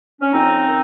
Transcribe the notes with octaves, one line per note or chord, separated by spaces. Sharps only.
C#4
F2 C4 D#4
D#3